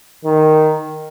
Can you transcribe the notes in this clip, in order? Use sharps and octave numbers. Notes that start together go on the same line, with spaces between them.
D#3